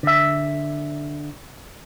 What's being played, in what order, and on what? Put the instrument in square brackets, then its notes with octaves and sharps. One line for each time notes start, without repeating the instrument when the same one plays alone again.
[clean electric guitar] D3 E5